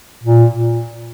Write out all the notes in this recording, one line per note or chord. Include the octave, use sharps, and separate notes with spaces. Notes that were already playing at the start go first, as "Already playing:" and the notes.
A#2